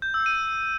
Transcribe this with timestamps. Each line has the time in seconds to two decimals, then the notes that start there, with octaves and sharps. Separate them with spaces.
0.02 G6
0.14 E6
0.26 D#7